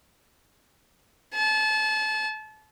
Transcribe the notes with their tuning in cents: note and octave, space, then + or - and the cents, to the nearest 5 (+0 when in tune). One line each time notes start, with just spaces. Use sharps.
A5 -30